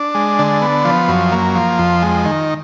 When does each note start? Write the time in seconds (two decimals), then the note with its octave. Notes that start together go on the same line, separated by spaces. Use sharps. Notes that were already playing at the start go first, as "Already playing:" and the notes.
Already playing: D4
0.15 G#3
0.39 D3
0.62 B3
0.85 F3
1.08 F#2
1.32 A#3
1.55 F3
1.79 F2
2.02 G#3
2.25 D#3